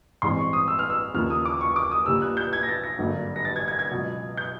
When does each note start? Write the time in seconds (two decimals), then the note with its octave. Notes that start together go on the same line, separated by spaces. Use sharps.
0.22 A1 G2 E3 G#3 C4 C6
0.38 C#6
0.53 D#6
0.68 E6
0.79 F6
0.90 E6
1.14 D#2 C#3 F3 A#3 F6
1.30 D#6
1.46 D6
1.61 C#6
1.76 D6
1.91 D#6
2.06 A#1 A#2 G3 A#3 E6
2.22 F#6
2.37 G6
2.53 G#6
2.63 A#6
2.68 A6
2.84 A#6
2.98 G#1 G2 D3 F#3 A#3
3.36 A#6
3.45 A6
3.56 G#6
3.68 G#6
3.79 G#6
3.90 C#2 B2 F#3
4.37 G6